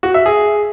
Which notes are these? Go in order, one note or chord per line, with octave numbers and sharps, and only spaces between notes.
F#4
E5
G#4